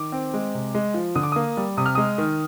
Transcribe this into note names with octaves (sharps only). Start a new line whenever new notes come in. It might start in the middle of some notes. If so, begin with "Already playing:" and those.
Already playing: D#3 D6
C4
G#3
C3
G#3
F3
D3 D#6
D6
A#3 D#6
G3
C3 D#6
F6
G#3 D#6
D#3